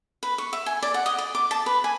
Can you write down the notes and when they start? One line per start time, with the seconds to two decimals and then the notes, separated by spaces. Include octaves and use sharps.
0.23 B4
0.38 C#6
0.53 E5
0.66 G#5
0.82 D5
0.94 F#5
1.06 D#5
1.18 D5
1.35 D6
1.51 A5
1.66 B4
1.84 G#5